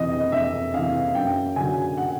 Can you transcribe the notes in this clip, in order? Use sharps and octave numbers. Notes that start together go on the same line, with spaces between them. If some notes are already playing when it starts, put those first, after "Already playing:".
Already playing: F2 C3 E3 D#5
D#5
F2 E5
C3 E3 F5
F#2 G5
D3 F#3 G#5
F#5